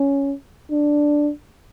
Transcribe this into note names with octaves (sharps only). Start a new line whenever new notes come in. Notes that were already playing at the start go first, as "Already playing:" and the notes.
Already playing: C#4
D4